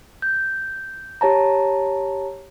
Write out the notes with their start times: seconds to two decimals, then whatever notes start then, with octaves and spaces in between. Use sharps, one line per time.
0.22 G6
1.21 G4 C#5 A5 A#5